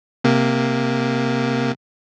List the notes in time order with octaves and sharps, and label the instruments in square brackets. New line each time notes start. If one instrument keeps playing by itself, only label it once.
[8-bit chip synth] C3 A#3